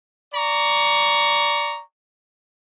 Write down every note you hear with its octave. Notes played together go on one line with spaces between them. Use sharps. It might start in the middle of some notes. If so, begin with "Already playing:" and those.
D5 A#5 C#6